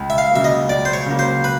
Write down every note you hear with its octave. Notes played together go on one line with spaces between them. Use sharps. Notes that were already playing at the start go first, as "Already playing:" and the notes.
Already playing: C#2
E5
F5
C#3 F#3 A#3 E5
D#5
C#2 D5
C5
C#5
C#3 F#3 A#3
C5
B4